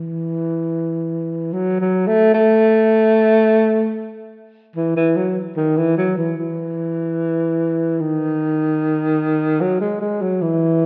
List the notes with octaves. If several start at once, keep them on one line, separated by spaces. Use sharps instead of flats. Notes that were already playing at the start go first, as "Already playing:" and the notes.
Already playing: E3
F#3
F#3
A3
A3
E3
E3
F#3
D#3
E3
F#3
E3
E3
D#3
F#3
G#3
G#3
F#3
E3